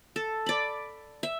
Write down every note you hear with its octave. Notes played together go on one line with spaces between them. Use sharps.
A4
D5 B5
E5